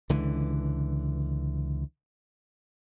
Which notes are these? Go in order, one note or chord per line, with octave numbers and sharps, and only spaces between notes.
C#2 D3 E3